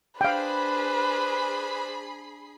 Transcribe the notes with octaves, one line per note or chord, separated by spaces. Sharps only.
D4 G#4 B4 C5 F5 G5 B5 C7